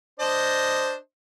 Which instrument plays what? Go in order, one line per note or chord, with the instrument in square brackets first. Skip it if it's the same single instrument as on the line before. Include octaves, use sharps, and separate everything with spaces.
[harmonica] D4 C5 D#5